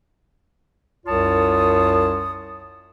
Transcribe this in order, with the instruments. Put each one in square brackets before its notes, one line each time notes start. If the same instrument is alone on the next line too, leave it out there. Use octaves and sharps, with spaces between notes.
[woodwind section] C2 F#2 F4 C#5 A5 D#6